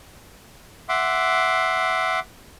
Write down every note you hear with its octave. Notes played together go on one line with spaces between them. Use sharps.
E5 F#5 C6 D6